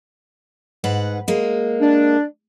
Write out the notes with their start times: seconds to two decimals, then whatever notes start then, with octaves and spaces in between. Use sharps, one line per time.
0.84 G#2 B4 F#5
1.28 G#3 A#3
1.81 D4